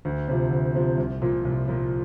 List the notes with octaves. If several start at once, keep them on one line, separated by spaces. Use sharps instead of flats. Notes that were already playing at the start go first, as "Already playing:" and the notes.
D2
C3 F3
D2
C3 F3
C2
A#2 F3
C2
A#2 F3